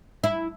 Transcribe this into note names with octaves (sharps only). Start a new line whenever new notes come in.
E4